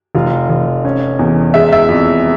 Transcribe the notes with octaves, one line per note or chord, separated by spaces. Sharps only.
F1 F4
F1
C#4
E2
G#3 E5
E5
F2